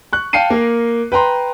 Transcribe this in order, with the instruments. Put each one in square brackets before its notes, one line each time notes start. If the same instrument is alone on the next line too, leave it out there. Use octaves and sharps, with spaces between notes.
[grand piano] C#6 F#6
F5 G5 A5 C7 C#7 D#7
A#3 A#4
B4 G5 A#5 C6